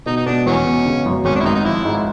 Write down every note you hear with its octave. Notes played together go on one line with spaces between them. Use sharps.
B2 D#4
D#4
B2 D4
E2 E3 F#3 C#4
B2
C#3
F#2
G#1 C#4
D4
E4
G#1 D#4
D#4
F3 E4
G#2